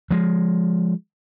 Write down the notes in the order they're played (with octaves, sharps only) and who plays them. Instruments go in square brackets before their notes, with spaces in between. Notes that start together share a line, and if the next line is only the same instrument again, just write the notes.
[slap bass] F3 G#3